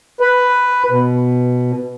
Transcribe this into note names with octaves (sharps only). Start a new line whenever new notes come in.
B4
B2